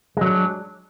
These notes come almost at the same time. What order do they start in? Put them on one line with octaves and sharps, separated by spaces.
G#3 F#3 D4